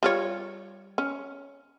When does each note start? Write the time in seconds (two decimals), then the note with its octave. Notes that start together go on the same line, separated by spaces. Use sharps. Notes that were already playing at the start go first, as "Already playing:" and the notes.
0.03 G3 F4 C#5
0.98 C#4